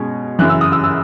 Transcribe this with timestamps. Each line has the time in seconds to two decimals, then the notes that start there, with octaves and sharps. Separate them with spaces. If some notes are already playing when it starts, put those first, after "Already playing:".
Already playing: B2 G#3 C#4
0.39 F#2 C#3 E3 F#6
0.50 E6
0.61 D#6
0.72 E6
0.84 E6